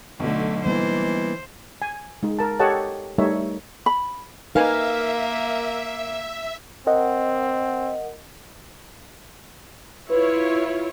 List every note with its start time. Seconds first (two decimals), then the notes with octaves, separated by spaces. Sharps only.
0.20 B1 D3 F#3 A3
0.66 E3 G3 A#3 B3 C5
1.82 G#5
2.23 G#3 D#4 G#4
2.39 A#4 A5
2.59 G4 A4 C#5 D#5 F#5 A5
3.18 G3 A3 D#4 A#4 C#5 E5
3.86 B5
4.55 A#3 D#4 A#4 B4 E5 F5 G#5
6.87 C4 A#4 D#5 F#5
10.10 E4 F4 B4 C#5